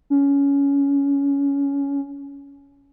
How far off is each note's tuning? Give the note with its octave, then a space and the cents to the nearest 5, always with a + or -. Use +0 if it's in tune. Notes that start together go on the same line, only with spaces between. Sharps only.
C#4 +15